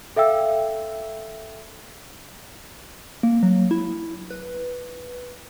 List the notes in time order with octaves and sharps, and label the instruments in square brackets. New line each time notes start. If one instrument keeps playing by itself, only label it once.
[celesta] A4 E5 F5 G5 E6
[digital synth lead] A#3
F#3
E4
B4